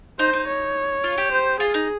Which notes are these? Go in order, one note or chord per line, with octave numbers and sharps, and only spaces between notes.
D#4 C5
D#4
C#5
F4
G4
C5
F4 G#4
D#4